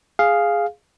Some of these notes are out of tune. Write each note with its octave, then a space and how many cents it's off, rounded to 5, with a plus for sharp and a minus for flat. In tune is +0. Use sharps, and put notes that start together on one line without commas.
G#4 +0 F5 +0